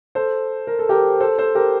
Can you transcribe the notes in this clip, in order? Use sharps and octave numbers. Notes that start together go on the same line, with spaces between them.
A4 C5
A#4
A4
G4 A#4
A4 C5
A4 C5
G4 A#4